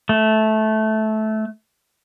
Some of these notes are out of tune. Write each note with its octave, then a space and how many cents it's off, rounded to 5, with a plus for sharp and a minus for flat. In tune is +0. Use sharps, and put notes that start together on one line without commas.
A3 -15